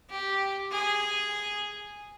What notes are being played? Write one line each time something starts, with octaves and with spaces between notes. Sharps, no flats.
G4
G#4